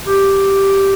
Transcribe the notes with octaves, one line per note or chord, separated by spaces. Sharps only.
G4